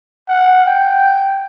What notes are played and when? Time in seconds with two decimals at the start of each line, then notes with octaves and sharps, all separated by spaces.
0.28 F#5
0.66 G5